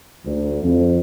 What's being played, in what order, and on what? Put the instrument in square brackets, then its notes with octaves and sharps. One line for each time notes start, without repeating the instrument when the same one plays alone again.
[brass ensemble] D2
F2